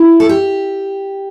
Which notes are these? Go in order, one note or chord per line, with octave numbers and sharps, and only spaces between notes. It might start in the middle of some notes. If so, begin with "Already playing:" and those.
Already playing: E4
A4
G4